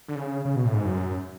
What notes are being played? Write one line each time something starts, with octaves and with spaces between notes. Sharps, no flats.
D3
C#3
C#3
B2
A2
G#2
F#2